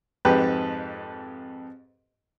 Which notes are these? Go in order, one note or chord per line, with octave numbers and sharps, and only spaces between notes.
F2 G#2 G4 B4